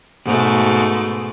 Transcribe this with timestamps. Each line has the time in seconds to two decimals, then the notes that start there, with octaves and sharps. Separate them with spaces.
0.25 G#2 B2 A3